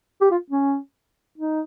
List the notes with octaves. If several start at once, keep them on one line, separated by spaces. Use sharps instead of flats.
G4
F4
C#4
D#4